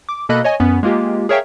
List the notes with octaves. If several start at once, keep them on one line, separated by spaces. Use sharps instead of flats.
D6
B2 A#3 A4 D#5 B5 F#6
C#5 D#5 G#5
F#2 B3 C#4
G#3 A#3 F4 G4
G#4 A#4 C#5 E5 F5 G5